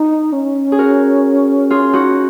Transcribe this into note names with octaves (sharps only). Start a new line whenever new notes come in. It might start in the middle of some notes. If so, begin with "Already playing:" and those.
Already playing: D#4
C#4
G#4
F#4 A#4
F4 G#4
D#4 F#4